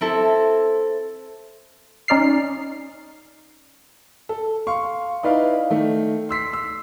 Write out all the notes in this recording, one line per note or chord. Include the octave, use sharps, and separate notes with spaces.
C4 E4 A4
C#4 D#4 D5 F6 C7
A4
F5 C6 C#6
D#4 E4 B4 D5 F5
D#3 A3
C6 E6 B6 C7
E6